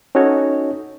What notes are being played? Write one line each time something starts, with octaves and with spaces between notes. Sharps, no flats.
C#4 D#4 F#4 A4 C#5 D#5